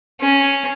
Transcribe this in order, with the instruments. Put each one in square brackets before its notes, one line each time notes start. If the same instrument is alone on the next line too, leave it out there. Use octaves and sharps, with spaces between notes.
[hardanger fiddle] C#4